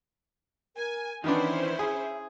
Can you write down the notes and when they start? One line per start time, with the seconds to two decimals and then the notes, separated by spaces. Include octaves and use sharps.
0.76 A#4 G#5
1.24 D#3 E3 B3 C#4 D4 E4 C5
1.79 G#4 E5